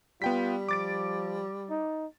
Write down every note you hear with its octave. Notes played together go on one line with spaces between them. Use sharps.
G3 B3 F4 G5 B6
F3 D6 A6 D7
D#4